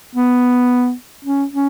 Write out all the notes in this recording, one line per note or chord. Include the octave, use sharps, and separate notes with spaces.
B3
C#4
C#4